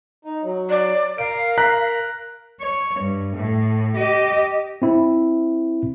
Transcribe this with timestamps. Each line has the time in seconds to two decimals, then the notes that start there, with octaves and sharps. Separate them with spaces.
0.25 D#4
0.43 F#3
0.70 D5
1.18 A#4 F5 D7
1.58 A#5 F#6 B6
2.61 C#5
3.00 G2
3.37 A2
3.96 G4 D#5
4.82 C4 E4